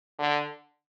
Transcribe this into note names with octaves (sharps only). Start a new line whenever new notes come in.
D3